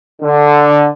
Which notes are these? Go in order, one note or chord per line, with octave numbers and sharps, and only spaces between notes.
D3